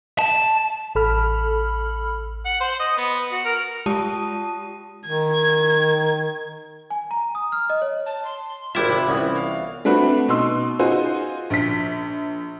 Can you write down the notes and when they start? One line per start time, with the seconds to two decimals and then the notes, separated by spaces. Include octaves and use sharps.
0.19 A5
0.95 A1 A4 B5 F6
2.45 F#5
2.60 C5
2.79 D#5
2.97 B3
3.32 F#4
3.45 A#4
3.86 G#3 F4 G4 A5 D#6 D#7
5.08 D#3 G#6
6.90 G#5
7.11 A#5
7.35 D#6
7.52 F6
7.70 D#5
7.82 C#5
8.06 A5
8.24 C6
8.75 G#1 E4 F4 G4 B4 E5 G#6
8.88 C3 B5
9.08 C2 E3 B3 C#4
9.35 F5
9.85 A3 C4 D4 F#4 B4
10.28 B2 D#4 C6 E6
10.79 D#4 F4 F#4 G#4 C5
11.50 A#1 B6